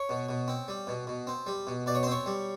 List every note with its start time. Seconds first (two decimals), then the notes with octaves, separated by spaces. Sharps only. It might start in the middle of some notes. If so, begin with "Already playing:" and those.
Already playing: C#5
0.09 B2
0.29 B2
0.48 C4
0.68 G3
0.87 B2
1.07 B2
1.27 C4
1.47 G3
1.67 B2
1.86 B2 D5
1.95 C#5
2.03 C5
2.07 C4 C#5
2.26 G3